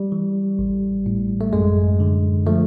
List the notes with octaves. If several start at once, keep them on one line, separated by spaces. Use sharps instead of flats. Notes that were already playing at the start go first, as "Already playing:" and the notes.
Already playing: G3
E3
A1
A2
A3
F#2 G#3
D3
F3 A3